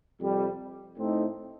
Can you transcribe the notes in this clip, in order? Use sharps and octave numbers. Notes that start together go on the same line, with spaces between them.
F2 C3 G3
A2 A3 C4 D#4